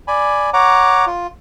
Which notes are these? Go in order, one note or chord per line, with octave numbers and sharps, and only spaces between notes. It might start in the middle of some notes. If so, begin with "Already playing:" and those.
D5 G#5 B5
C#5 F#5 A#5 D6
F4